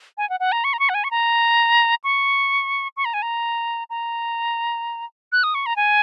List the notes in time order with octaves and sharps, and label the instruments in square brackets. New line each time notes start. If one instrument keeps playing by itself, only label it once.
[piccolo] G#5
F#5
F#5
A#5
C#6
A#5
C#6
F#5
G#5
C#6
A#5
C#6
C#6
A#5
G#5
A#5
A#5
F#6
D#6
C#6
A#5
G#5